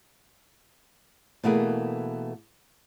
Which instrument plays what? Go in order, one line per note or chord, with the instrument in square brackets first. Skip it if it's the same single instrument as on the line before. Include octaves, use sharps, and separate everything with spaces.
[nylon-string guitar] B2 E3 A3 A#3 G#4 B4